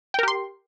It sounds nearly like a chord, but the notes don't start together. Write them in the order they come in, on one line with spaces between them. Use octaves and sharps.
G5 A#4 G4 C6